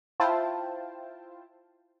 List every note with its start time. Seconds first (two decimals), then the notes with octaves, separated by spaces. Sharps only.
0.20 E4 F4 C5 G5 A5